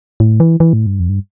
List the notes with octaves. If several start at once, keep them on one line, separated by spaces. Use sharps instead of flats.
A2
E3
E3
A2
G2
F2
G2